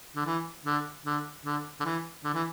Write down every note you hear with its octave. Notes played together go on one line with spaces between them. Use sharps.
D3
E3
D3
D3
D3
D3
E3
D3
E3